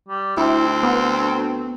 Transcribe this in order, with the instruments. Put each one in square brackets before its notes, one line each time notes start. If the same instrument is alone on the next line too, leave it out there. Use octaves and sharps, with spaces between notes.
[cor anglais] G3
[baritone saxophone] D2 [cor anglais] C4 [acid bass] E4
[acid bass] B3